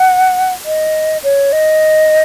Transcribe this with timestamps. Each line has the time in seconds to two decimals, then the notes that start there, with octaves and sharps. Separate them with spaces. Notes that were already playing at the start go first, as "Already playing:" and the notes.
Already playing: F#5
0.65 D#5
1.23 C#5
1.52 D#5